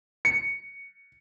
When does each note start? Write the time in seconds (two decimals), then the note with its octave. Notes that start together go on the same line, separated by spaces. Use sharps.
0.25 C#7